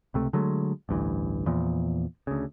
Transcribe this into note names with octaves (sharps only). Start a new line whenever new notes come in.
C#2 C3 A3
D3 F#3 G#3 A3
A1 D2 G2 E3
E2 A#2 F3
D2 C#3